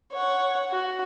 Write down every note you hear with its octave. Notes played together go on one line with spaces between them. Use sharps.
C#5 F#5
F#4